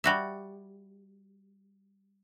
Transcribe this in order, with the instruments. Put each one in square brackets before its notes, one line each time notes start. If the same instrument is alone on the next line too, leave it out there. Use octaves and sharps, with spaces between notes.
[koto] G3 F#4 E5